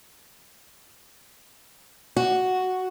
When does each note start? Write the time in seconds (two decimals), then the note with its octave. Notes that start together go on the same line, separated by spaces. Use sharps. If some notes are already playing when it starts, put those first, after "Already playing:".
2.16 F#4